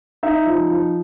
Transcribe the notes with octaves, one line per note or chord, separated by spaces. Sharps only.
D#4 E5
F3
F3